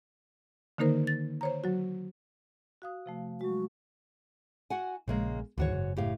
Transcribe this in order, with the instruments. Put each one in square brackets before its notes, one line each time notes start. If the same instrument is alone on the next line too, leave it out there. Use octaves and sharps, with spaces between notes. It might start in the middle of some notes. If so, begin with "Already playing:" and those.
[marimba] D3 D#3 A#3 D#4 A#4 C5
A6
C5 C#5 A#5
F#3 F#4
F#4 F5 D#6
C3 F3 A3
[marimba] F#3 G#3 [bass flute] F#4
[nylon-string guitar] F#4 F#5 G#5
[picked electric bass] A#1 [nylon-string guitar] C#3 G#3 A#3
[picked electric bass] D2 D#3 E3 [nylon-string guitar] G#2 F#4 C#5
[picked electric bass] F#1
[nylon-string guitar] A2 G4 F5